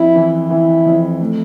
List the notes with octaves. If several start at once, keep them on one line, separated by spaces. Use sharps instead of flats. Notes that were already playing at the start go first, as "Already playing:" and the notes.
Already playing: F2 E4
E3
E3 E4
F2
A3